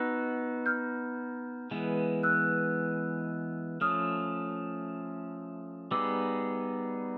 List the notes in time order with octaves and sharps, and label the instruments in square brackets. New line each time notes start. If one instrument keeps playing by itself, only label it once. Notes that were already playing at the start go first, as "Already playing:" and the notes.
Already playing: [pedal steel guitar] B3 D#4 F#4 [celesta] E6 F#6
[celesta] F6 G6
[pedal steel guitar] E3 G#3 B3
[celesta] E6 F#6
[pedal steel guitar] F3 A3 C#4 [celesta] D#6 F6
[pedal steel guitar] G3 B3 D#4 G#4 [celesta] D6 E6